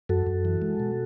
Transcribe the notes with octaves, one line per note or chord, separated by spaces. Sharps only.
F#2 F#4 A4
F#2
E3
G#3
B2